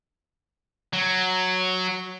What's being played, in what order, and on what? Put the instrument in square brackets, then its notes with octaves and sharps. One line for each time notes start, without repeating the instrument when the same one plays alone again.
[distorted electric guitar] F#3